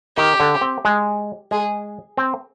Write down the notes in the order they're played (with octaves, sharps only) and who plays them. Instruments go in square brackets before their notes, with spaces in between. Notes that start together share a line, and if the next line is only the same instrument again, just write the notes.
[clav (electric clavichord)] D#3 [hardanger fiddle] G4
[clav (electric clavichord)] D3
C4
G#3
[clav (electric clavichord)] G#3 [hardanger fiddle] G#4
[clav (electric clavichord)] C4